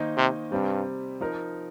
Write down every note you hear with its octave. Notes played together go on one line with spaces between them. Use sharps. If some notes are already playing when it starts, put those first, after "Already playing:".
Already playing: D#3 A#3 D#4 C5 D#5
C3
G2 C3 G3 C4
F3 D#4 A#4